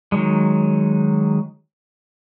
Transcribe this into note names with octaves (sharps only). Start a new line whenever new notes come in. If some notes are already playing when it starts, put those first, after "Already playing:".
D#3 F#3 G#3